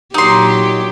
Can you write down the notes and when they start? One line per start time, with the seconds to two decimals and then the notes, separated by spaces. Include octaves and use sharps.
0.14 A#2 F#3 D#4 G4 C6